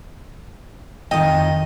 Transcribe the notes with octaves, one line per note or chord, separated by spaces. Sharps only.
F2 D#3 D#5 G5